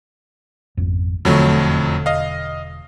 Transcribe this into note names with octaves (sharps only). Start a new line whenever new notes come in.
G#1 F2
E1 F2 D3 F#3 A3
D#5 F5